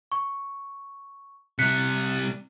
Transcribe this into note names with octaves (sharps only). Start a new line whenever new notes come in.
C#6
C3 G3 F#6 B6 C#7